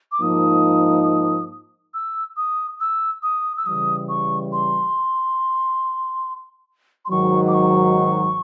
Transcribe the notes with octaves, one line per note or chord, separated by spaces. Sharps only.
D6
G#2 F3 A#3 D#4 D#6
E6
D#6
E6
D#6
E6
C#3 E3 G3 D#6
C#6
C6
C6
G#2 D#3 F#3 C#6
D6
C#6